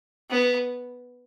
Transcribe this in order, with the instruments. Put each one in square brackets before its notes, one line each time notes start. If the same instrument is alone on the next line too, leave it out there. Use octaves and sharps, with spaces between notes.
[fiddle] B3